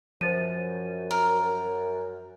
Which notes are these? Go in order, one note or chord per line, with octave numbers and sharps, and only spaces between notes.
F#2 F3 C5 A6 D#7
A#4